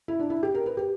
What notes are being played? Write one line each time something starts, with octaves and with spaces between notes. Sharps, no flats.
E4
D4
E4
G4
A#4
B4
G4